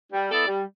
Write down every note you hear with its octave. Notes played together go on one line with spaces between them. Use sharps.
G3
B3 E4 A4 D5
G3